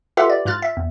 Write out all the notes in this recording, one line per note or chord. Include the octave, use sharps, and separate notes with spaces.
F4 G4 A4 B4 E5 F#5
D5
G#2 F4 F6 F#6 A6
E5
E2